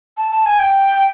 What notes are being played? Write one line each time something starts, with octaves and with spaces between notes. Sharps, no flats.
A5
A5
G#5
G5